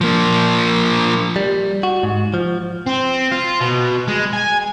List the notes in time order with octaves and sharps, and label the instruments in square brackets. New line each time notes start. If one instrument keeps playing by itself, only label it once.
[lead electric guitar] F3 A#3
[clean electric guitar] G3
F#4
G#2
F3
[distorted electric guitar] C4
F4
B2
G#3
G#5